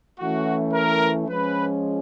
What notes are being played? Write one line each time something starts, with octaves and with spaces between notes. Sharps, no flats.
E3 A3 C#4 F#4
A#4
F3 G#3 C#4 B4